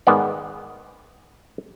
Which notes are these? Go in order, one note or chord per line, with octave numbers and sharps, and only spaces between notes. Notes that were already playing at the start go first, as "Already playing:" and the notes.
G#2 D#3 B3 D5